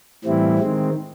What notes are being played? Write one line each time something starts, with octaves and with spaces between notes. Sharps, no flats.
A2 E3 G3 C4 E4
D#3 G#3 C4